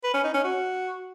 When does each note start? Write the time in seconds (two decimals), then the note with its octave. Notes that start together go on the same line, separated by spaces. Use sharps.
0.04 B4
0.14 C#4
0.24 D#4
0.34 C#4
0.44 F#4